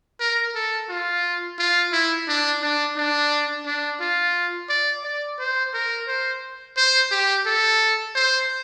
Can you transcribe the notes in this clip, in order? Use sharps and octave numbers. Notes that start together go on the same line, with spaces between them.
A#4
A4
F4
F4
E4
D4
D4
D4
D4
F4
D5
D5
C5
A#4
C5
C5
G4
A4
C5